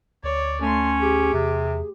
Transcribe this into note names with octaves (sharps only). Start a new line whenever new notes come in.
D2 C#5 D5
A3 C#4 C6
G4 G#4
E2 C3